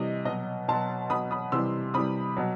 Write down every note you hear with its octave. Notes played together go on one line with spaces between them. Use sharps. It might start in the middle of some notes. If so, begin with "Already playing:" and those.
Already playing: C3 E3 G3 D#5
B2 F#3 D#5
B2 F#3 A5 C6
B2 F#3 B5 D#6
B5 D#6
C3 E3 G3 C6 E6
C3 E3 G3 B5 D#6
B2 F#3